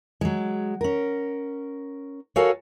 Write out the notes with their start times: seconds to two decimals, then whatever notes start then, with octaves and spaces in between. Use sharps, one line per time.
0.21 F#3 G#3
0.81 C#4 A#4
2.36 F#4 A4 A#4 C#5 F5 G#5